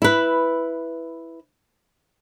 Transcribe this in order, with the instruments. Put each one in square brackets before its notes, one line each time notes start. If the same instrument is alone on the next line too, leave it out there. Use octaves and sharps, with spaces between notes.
[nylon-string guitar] E4 B4